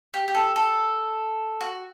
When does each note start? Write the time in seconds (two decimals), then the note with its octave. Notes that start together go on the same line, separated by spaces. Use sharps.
0.14 G4
0.28 G4
0.35 A4
0.56 A4
1.61 F#4